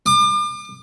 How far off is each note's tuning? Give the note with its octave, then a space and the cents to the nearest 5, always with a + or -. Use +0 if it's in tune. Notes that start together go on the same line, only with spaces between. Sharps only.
D6 +40